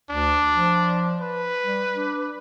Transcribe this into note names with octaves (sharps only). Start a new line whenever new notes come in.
D2 D4
F3
B4
G3
D4